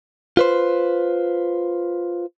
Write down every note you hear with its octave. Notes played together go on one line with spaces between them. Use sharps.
F4 B4 C5